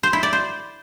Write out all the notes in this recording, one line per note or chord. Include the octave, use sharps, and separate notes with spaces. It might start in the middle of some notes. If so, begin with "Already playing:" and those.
C5
E4
D5
C5